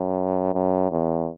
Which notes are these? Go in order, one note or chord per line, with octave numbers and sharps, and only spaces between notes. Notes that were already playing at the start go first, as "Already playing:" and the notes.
Already playing: F#2
F#2
E2